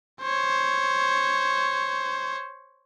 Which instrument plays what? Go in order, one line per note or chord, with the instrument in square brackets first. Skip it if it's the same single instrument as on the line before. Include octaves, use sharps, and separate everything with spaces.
[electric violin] C5 C#5